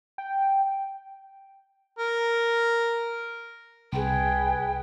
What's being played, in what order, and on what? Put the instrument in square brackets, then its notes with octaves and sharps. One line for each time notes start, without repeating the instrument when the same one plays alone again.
[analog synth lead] G5
[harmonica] A#4
[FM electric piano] C2 [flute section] G#4 B4 [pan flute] G5